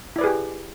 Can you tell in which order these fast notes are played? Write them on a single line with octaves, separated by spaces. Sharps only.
E4 D5 B4 G#4 G4